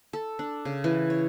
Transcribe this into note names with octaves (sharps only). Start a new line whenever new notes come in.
A4
D4
C#3
E3
C#5